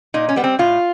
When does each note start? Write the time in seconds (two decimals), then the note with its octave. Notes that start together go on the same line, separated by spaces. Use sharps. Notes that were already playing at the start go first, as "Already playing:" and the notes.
0.14 A#2 D#4
0.29 C#4
0.36 G3 B3
0.44 C4
0.59 A2 F4